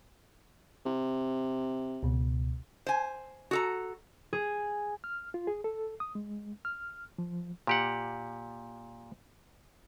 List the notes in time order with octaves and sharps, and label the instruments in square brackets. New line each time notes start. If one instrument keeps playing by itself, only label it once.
[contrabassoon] C3
[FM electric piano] C#2 B2
[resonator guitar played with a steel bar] C5 G#5
F#4 A4 A#5
[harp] G#4
[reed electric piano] F6
F4
G#4
A4
D#6
G#3
F6
F3
[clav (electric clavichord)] A#2 G4 F#5